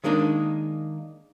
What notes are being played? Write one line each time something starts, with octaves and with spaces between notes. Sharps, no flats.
D#3 G#3 A#3 D4 D#4